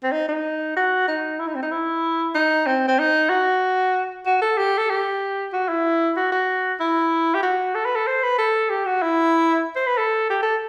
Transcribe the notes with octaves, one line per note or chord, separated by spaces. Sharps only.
C4
D#4
D#4
F#4
D#4
E4
D#4
C4
D#4
E4
D#4
C4
C4
D#4
F#4
F#4
A4
G4
A4
G4
F#4
E4
F#4
F#4
E4
G4
F#4
A4
B4
A4
C5
B4
A4
G4
F#4
E4
C5
B4
A4
G4
A4